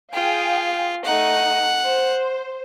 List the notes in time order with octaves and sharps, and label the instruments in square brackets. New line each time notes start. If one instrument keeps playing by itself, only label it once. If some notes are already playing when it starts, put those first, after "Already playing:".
[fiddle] F4 [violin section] G#4 F5 G5
[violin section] A3 D#4 [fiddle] F#5
[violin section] C5